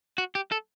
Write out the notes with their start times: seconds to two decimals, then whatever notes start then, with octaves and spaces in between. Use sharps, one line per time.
0.18 F#4
0.35 G4
0.52 A4